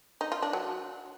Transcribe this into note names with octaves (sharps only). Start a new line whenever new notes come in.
D#4
F4
D4
F#3